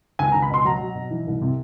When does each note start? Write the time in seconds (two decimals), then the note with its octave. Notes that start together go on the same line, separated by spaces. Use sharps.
0.19 C#2 G#5
0.32 A#5
0.34 C#2
0.42 B5
0.50 B2 C6
0.65 F#3 A#5
0.80 F#3
0.95 B2
1.11 E3
1.27 C2
1.41 C3